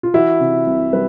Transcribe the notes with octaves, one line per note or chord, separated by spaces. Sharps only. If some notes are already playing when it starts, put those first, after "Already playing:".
F4
E3 E4 F#4
C3
C2
G3 B4